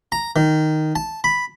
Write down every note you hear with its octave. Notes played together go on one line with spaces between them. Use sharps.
A#5
D#3
A5
B5